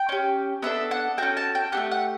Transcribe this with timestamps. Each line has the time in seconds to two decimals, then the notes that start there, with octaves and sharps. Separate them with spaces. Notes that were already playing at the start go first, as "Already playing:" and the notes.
Already playing: G5
0.09 C#4 G4
0.63 B3 D4 A4 E5
0.91 F#5
1.17 C#4 F#4 A4 G5
1.37 A5
1.55 G5
1.72 A3 D4 G4 F#5
1.91 F#5